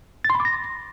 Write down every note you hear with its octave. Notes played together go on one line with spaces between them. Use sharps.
A6
C6
B5
D6
A#6